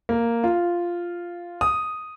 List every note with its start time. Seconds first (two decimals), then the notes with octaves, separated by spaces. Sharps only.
0.09 A#3
0.44 F4
1.61 D#6